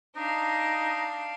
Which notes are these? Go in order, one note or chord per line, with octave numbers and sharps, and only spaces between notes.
D4 D#4 F5